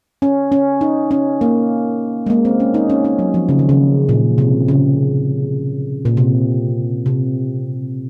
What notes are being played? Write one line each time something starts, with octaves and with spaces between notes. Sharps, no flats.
C#4
C#4
D#4
C#4
A#3
G#3
A#3
C4
C#4
D#4
C#4
C#4
F#3
F3
C#3
D#3
C#3
A#2
C3
C#3
A#2
C3
C3